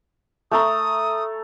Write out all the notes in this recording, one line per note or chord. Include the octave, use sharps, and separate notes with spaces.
A3 A4 A#5 D#6